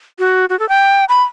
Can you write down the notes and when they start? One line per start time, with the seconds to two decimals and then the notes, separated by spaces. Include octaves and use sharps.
0.19 F#4
0.49 F#4
0.59 A4
0.69 G5
1.09 B5